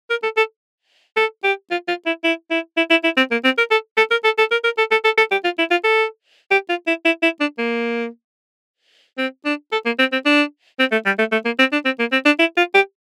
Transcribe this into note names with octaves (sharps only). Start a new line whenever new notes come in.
A#4
A4
A4
A4
G4
F4
F4
E4
E4
E4
E4
E4
E4
C4
A#3
C4
A#4
A4
A4
A#4
A4
A4
A#4
A#4
A4
A4
A4
A4
G4
F4
E4
F4
A4
G4
F4
E4
E4
E4
D4
A#3
C4
D4
A4
A#3
C4
C4
D4
C4
A3
G3
A3
A3
A#3
C4
D4
C4
A#3
C4
D4
E4
F4
G4